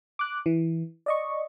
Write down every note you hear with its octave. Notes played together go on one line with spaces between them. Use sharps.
D6 F#6
E3
D5 D#5 C#6